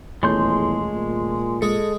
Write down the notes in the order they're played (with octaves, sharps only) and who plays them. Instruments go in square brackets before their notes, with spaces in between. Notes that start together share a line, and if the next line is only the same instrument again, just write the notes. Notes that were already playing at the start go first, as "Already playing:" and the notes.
[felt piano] D#1 A3 C#5 [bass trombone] E2 [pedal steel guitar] G#3 C6 G6
[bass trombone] A#2
[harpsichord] G#3 [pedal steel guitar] A4